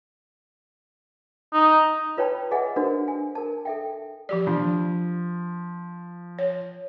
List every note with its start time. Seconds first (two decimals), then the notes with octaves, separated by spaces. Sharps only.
1.53 D#4
2.17 F4 B4 C#5 G5 A5 B5
2.51 G#4 B4 D#5 E5 F#5 G#5
2.76 D4 F#4 A#4 C5
3.08 G#5
3.35 A#4 A5
3.65 A4 E5 G5
4.29 F3 G4 D5
4.47 F3 D4
6.39 C#5